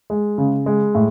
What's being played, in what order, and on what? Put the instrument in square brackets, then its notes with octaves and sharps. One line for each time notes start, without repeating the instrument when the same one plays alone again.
[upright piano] G#3
C#3
G#3
A2